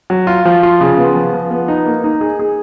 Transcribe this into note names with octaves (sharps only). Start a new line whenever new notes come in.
F#3
F4
F3
F4
C#3
B3
F3
F3
B3
D#4
A#3
D#4
G#4
G#4